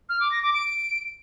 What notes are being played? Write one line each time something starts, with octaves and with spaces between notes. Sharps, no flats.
F6
D6
A#6
D6
D7